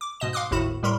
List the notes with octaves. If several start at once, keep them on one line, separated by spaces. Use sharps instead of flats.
D6
G#2 B2 D#5 E7
F5 C6 D6 D#6 F#6
G#1 D#2 A2 F#4 B5 E7
A2 G3 A#4 B5 C6